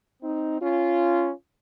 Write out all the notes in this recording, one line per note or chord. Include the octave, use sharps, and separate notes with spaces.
C4 D#4
C#4 F4